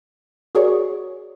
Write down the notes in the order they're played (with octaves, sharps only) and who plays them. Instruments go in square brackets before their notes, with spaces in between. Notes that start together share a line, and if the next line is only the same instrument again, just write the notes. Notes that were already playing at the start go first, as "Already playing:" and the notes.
[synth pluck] F#4 G#4 A#4 C#5 D5 C#6